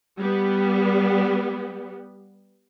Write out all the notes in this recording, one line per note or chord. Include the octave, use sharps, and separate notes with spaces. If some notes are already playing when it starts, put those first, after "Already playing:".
G3 B3